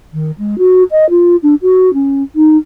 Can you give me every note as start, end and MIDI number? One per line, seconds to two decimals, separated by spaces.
0.13 0.31 51
0.38 0.58 56
0.58 0.83 66
0.91 1.08 75
1.09 1.36 65
1.42 1.54 62
1.62 1.92 66
1.93 2.22 61
2.35 2.56 63